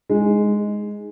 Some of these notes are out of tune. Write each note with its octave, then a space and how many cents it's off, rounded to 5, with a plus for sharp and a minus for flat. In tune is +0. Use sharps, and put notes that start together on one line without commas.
G#3 +0 D#4 +10